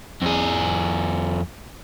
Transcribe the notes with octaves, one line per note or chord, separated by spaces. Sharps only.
F2 G#4